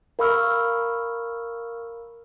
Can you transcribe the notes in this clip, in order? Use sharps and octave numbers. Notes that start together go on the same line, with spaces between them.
A#4 F5 B5 C#6 E6 F6